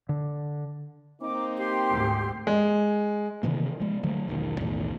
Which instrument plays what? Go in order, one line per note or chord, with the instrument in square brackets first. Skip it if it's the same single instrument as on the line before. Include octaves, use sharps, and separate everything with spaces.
[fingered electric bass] D3
[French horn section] A#3 C4 D#4 [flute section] D6
[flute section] G4 C6
[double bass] D2 G#2
[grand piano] G#3
[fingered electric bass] C3 D#3 E3 A#3
F3 G#3
D3 F#3 A3
E1 B1 D#3
B1 E2 A2 D#3